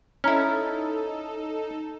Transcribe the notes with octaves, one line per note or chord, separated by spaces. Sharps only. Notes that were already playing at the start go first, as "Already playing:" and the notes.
C#4 D#4 E4 A4 A#5 F6